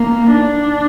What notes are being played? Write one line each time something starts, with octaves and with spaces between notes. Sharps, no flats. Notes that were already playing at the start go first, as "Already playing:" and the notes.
Already playing: A#3
D4